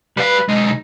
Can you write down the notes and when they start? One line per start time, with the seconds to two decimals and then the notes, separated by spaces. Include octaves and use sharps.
0.17 G3 B4 F5
0.49 B1 G#3 D#4